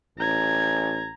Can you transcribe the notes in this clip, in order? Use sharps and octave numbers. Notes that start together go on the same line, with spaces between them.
A1 A#5 G#6